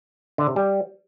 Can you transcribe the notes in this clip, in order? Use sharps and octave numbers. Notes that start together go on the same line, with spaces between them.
D3
C3
G3